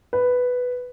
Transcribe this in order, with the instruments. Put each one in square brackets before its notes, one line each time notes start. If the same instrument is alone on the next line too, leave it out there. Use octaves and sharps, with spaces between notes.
[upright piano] B4